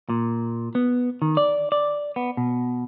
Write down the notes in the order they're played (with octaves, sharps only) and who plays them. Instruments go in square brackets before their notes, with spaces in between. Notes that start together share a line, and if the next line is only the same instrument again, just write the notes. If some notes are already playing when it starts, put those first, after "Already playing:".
[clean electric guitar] A#2
B3
D#3
D5
D5
B3
B2